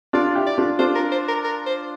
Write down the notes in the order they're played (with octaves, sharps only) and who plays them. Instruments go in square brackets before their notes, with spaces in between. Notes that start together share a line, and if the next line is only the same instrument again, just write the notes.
[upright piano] D4 F4 [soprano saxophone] D5
[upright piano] E4 G4
[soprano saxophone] D5
[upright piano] D4 F4
[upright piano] D4 F4 [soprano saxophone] C5
[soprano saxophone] A#4
C5
A#4
A#4
C5